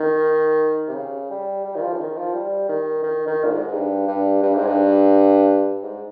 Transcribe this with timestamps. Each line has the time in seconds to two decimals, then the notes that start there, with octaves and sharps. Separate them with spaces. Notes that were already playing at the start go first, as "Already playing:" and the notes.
Already playing: D#3
0.88 C3
0.95 C#3
1.30 G3
1.65 G3
1.75 D#3
1.82 F3
1.94 C#3
1.99 D#3
2.18 F3
2.34 G3
2.69 D#3
3.03 D#3
3.27 D#3
3.44 A#2
3.51 G#2
3.68 G#2
3.73 G2
4.08 G2
4.43 G2
4.55 G#2
4.66 G2
5.83 G#2